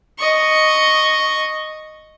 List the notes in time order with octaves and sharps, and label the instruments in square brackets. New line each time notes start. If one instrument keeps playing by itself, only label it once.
[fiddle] D#5 C#6